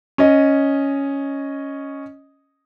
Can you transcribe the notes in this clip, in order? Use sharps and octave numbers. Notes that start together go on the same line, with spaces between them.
C#4 D#5